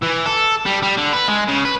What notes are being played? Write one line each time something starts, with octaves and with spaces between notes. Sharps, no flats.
E3
A4
G3
G3
D3
B4
G#3
C#3
B4